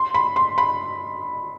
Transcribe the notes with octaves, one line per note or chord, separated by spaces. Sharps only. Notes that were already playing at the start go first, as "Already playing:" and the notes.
Already playing: C6
B5
C6
B5